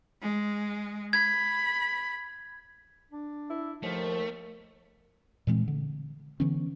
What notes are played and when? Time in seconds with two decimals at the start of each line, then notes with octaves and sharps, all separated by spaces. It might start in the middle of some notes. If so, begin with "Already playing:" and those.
0.20 G#3
1.13 B5 G#6
3.12 D4
3.50 E4
3.83 D#2 F3 A3 A#4
5.47 A#2 E3 G#3 C4
5.68 D3
6.40 D3 E3 B3 C#4